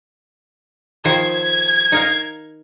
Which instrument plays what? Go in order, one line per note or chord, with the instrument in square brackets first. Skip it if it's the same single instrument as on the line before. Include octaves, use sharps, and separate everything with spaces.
[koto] D#3 F3 C5 [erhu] G#6
[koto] D#4 A#4 F5